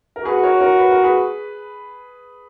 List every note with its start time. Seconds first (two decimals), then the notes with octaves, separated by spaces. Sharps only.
0.16 A#4
0.24 F#4 G#4 B4
0.43 A#4 C#5
0.61 A#4 C#5
0.78 B4
0.91 A#4
1.03 G#4 B4